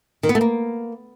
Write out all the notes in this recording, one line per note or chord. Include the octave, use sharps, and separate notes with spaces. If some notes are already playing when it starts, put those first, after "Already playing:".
D#3
B3
A3
A#3